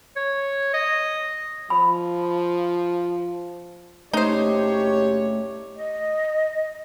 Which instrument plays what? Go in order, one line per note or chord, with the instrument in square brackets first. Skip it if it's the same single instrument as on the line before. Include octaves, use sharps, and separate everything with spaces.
[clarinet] C#5
D#5
[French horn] F3 [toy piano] B5
[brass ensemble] F#1 D4 C#5 [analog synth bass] A3 [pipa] D#4 C5 [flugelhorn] G4
[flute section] D#5